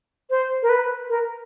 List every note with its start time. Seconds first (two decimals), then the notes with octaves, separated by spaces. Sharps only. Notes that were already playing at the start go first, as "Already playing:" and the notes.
0.30 C5
0.62 A#4
0.69 B4
1.10 A#4